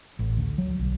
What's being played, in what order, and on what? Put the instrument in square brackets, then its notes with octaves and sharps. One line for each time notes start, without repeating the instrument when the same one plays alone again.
[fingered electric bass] A1
D2
F#3
B1